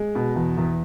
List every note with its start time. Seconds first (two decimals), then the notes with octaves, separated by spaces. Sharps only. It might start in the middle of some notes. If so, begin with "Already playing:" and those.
Already playing: G#3
0.15 B2
0.36 E2
0.57 E2